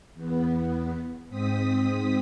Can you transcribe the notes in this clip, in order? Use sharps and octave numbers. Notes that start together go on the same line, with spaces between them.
E2 B3
G#2 C4 D#6 B6